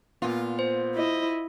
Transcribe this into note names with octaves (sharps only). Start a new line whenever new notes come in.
A#2 B3 F4
C5
E4 D#5